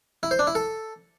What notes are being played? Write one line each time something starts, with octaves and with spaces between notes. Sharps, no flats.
E4
C5
D4
E4
A4